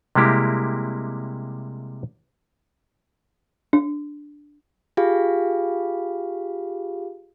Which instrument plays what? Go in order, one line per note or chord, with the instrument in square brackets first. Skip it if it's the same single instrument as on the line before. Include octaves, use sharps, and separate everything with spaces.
[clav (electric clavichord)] C3 G3 G#3 A#3 E4 G4
[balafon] D4
[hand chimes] F4 G4 G#4 F5